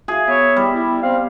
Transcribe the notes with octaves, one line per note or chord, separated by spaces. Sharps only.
F#4 G#4 E5 F5
B3 C#5 E5
G3
E4
C4 F5